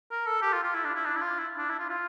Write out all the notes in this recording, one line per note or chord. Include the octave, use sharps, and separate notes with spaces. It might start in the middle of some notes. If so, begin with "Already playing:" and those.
A#4
A4
G4
F4
F4
E4
D4
E4
D4
E4
F4
E4
D4
E4
F4
F4